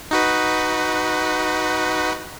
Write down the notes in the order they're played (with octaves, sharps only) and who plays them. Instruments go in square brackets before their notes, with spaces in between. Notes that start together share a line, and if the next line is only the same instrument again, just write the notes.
[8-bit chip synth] D#4 F#4 B4